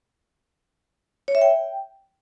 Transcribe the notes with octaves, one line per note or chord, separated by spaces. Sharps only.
C#5
E5
G5